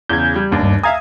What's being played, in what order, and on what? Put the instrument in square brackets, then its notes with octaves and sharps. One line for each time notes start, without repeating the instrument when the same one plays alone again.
[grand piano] E2 C#3 [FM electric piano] G6 G#6
[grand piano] G3
F1 D#2 D4
[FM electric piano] G2
[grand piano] E5 F5 D#6 [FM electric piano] G#5 A#5 G#6